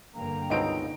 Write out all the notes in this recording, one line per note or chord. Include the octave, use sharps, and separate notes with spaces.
G2 D3 A#3 G5 A#5
C#2 B2 C4 D#4 D7